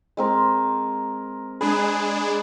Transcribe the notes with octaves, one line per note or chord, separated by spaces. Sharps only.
G#3 C4 A#4
G#3 D4 G#4 B4